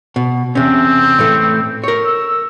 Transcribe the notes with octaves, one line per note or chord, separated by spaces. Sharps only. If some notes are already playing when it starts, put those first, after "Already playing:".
B2
E2 C3 C4 C#4
A2 E3 A3
A#4 C#5
E6